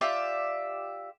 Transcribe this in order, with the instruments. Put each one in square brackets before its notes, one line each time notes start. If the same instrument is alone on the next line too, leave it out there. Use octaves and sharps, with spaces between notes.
[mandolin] F4 G4 D5 E5